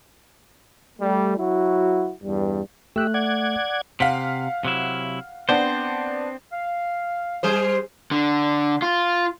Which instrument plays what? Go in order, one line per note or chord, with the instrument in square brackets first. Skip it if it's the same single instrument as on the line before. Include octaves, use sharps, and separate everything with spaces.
[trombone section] G3 A3
F#3 E4 F#4
E2 G2 G3
[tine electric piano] A3 F#6 [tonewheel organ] G4 E5
[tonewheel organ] D5 F#5 G#6
[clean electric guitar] C3 [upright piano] F5 F#5 B6
[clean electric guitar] C3 F#3 E4
[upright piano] B3 D4 [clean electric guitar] C4 C5
[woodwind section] F5
[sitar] G3 G#4 C5
[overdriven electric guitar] D3
F4